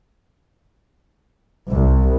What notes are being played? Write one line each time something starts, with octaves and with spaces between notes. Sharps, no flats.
C2